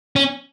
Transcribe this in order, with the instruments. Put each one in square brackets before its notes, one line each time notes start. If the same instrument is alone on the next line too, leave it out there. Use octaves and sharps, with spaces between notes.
[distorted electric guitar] C#4